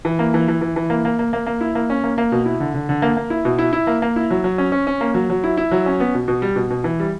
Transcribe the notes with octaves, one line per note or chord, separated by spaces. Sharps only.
E3
A#3
E3
E3
E3
E3
A#3
A#3
A#3
A#3
A#3
E4
A#3
C#4
A#3
A#3
B2
E4
D3
D3
D3
A#3
A#3
E4
B2
E4
E4
A#3
A#3
E4
F#3
F#3
C#4
C#4
C#4
A#3
F#3
F#3
E4
E4
F#3
C#4
B3
B2
B2
G3
B2
B2
E3
G3